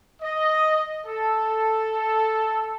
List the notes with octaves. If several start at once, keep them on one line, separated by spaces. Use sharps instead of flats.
D#5
A4